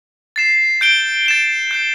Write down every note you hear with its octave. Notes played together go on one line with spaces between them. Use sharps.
A6 C7 E7
G6 D7 G7
A6 E7 G7
G6 C7 G7